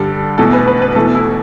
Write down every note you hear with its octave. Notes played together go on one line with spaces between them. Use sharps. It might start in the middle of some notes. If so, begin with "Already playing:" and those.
Already playing: G2 D3 G3 A4
E2 B2 A3 A4
B4
B4
B4
E2 B2 A3 A4
E4